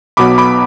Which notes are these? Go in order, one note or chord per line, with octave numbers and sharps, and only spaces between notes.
B1 B2 F#3 B3 B5 D6
B5 D6